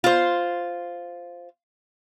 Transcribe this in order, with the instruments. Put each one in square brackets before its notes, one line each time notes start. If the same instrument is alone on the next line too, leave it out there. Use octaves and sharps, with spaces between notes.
[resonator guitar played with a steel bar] F4 C5